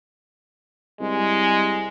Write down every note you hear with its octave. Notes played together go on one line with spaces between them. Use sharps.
C2 G#3